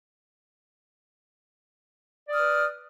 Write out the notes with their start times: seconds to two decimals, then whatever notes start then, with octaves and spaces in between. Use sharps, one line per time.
2.27 D5
2.31 D#6
2.35 F6
2.39 B4